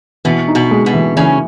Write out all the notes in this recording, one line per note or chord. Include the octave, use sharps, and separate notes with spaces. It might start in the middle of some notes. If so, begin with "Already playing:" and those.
B2 E3 B3
D#4
B2 B3
G#3
B2 B3
E3
C#3 E3 C#4